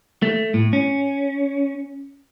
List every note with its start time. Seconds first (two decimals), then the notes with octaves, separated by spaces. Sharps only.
0.22 A3
0.54 A2
0.73 C#4